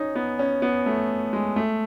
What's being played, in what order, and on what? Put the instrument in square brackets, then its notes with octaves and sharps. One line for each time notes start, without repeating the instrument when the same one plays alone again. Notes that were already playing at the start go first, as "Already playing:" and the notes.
Already playing: [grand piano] C#4 D#4
B3
C#4
B3
A3
G#3
A3